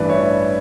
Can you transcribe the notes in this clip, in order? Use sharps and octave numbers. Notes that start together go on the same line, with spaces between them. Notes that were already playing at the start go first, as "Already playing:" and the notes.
Already playing: A1 G2 E3 B4 D5
C#5 E5